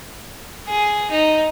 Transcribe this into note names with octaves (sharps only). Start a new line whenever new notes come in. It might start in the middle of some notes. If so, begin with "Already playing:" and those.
G#4
D#4